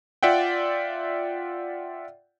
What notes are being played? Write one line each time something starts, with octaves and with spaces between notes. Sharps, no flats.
F4 D5 E5 F#5 G5